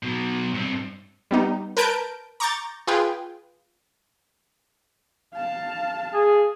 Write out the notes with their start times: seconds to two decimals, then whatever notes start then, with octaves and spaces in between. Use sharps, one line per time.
0.03 B2 F#3
0.54 G2 C4
1.31 G3 B3 D#4
1.77 A#4 B4 A5 G6 D7
2.40 A#5 C#6 D6 G6 A6
2.87 F4 G#4 B4 G5
5.33 F5 A5
6.13 G#4